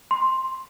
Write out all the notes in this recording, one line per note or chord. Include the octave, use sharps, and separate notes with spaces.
C6